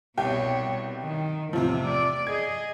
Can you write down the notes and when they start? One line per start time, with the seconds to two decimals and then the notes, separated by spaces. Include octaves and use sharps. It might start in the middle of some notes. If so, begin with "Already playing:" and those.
0.18 C2 B2 G4 C#5 G5
1.03 D#3
1.53 E2 A2 C3 F3
1.88 D5
2.27 G#4 D#5 G#6